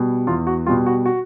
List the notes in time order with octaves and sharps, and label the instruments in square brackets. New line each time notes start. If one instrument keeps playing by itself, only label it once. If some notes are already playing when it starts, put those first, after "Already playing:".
Already playing: [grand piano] B2 G3
E2 F4
F#4
B2 G3 F4
F#4
F#4